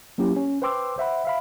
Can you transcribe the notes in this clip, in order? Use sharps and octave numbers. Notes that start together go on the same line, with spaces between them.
F#3 A#3 C#4 E4 G4
C#4
B4 C5 G5 C6 D6 E6
C5 E5 F#5 B5
E5 F5 B5